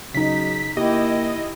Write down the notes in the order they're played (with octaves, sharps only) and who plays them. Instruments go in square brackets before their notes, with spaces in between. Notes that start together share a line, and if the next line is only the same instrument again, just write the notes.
[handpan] C#3 D#4 [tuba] F#3 [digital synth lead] B6
[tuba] A#3 [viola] E4 [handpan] G4 [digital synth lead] D#5